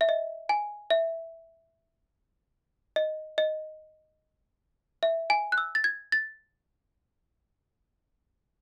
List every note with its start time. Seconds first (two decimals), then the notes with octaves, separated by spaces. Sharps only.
0.01 E5
0.09 D#5
0.49 G#5
0.90 E5
2.96 D#5
3.38 D#5
5.03 E5
5.30 G#5
5.52 F#6
5.58 E6
5.75 A6
5.84 G#6
6.12 A6